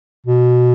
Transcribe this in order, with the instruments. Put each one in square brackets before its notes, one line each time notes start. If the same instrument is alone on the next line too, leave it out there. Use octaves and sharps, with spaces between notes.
[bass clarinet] B2